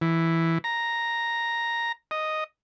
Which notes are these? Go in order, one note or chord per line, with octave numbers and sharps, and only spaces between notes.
E3
A#5
D#5